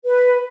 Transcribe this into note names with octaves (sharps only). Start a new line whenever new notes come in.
B4